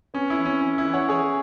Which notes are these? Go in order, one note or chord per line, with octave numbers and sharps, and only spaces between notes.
B3 C#4
E4
E3
C#4
E3 C#4
E4
E3
C#5 F#5
E3 G#4 C#5